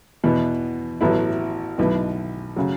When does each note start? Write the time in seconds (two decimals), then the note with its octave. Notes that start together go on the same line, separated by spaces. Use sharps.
0.24 E2 B2 B3
1.01 A1 A2 F#3 B3 E4
1.78 B1 B2 B3 E4
2.56 C#3 F#3